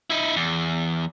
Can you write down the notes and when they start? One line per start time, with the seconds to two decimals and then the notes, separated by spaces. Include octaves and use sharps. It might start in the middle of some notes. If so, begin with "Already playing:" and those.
0.10 D#4 E4
0.36 E2